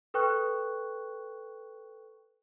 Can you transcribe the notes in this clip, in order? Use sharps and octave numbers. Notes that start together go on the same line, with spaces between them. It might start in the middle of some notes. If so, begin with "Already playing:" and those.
A4 B4 G5 C#6 F#6